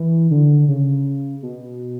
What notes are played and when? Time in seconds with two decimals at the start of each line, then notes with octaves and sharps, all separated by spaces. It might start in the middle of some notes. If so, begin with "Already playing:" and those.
Already playing: E3
0.31 D3
0.68 C#3
1.42 B2